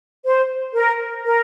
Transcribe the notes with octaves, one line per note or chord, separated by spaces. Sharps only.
C5
A#4
A#4